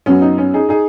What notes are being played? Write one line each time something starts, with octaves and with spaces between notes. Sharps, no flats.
F#2 F#3 B3 C#4
D#4
C#4
D#4 G#4
D#4 G#4